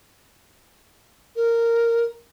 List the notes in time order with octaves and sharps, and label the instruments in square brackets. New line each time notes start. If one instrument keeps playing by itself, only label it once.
[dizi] A#4